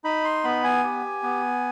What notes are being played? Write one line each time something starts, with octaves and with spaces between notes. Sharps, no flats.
D#4 B5
C6
B3 B5
G#5
G4
B3